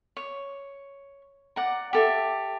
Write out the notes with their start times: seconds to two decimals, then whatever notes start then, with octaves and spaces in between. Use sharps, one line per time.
0.17 C#5
1.56 D5 F#5 A#5
1.93 G4 A4 E5